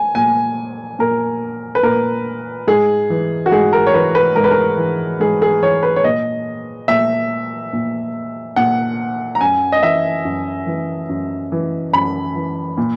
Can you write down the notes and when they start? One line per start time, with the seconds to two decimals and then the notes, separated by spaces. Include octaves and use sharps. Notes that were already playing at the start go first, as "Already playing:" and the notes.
Already playing: G#5
0.15 A#2 G#5
0.99 A#2 A#4
1.75 B4
1.83 A#2 A#4
2.67 G#2 G#4
3.10 E3
3.46 F#4
3.52 G#2 G#4
3.73 A#4
3.87 C#5
3.94 E3 B4
4.15 B4
4.36 G#2 A#4
4.44 B4
4.51 A#4
4.78 E3
5.20 G#2 G#4
5.42 G#4
5.62 E3 C#5
5.83 B4
5.96 C#5
6.04 A#2 D#5
6.88 A#2 E5
7.73 A#2
8.56 A#2 F#5
9.35 A#5
9.41 F#2 G#5
9.72 D#5
9.83 E3 E5
10.25 F#2
10.67 E3
11.09 F#2
11.52 E3
11.93 F#2 B5
12.35 E3
12.78 A#2